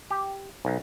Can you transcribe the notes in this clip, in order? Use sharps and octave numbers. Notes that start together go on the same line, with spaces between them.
G4
B1